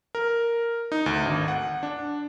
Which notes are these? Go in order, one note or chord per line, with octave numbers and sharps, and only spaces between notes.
A#4
D#4
D2
G#1
F#5
D4